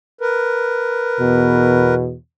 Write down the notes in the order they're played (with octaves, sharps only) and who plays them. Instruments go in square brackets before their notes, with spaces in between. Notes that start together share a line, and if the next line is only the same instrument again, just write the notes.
[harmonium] A#4 B4
[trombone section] E2 B2